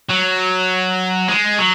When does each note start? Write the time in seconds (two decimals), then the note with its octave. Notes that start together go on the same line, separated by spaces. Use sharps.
0.09 F#3
1.28 G#3
1.59 F#3